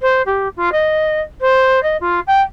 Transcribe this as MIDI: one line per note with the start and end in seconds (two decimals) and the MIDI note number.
0.01 0.22 72
0.26 0.48 67
0.57 0.69 65
0.72 1.21 75
1.41 1.82 72
1.83 1.97 75
2.01 2.20 65
2.27 2.41 79